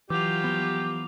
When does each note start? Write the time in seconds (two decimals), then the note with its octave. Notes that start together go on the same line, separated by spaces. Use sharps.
0.10 E3 F#3 F4 G4 D6 F7
0.44 E3 F3 B3